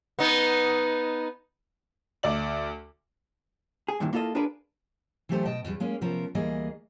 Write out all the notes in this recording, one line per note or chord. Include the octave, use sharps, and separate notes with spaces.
B3 D#4
D2 D5 F#7
G#4
G2 A#2 D#3 E3
A#3 E4 F4 A4 D#5
D4 F4 G#4 A#4 B4 D5
E3 F#3 A3 G4 A4 C5
B2 D#5 G5 A5
E2 G3
G#3 A#3 C#4
C3 F3 B3 C#4 A#4
D2 E3 G3 A#3 G#4 D#5